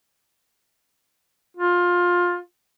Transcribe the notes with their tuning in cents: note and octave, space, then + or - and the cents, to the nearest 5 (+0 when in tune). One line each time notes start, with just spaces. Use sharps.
F4 +20